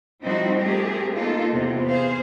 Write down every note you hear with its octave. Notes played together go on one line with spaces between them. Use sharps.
F3 G3 C4 D#4 E4 F#4
A3 C4 G4 G#4 A#4
A#3 B3 D#4 F4 A4
E2 C3 B3 C4
G#4 C5 F5